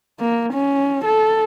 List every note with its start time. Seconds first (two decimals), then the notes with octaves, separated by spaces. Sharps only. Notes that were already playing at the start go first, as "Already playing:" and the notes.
0.20 A#3
0.53 C#4
1.05 A4